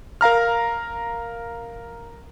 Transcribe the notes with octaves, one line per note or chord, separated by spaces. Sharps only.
A#4 F5 A#5 F6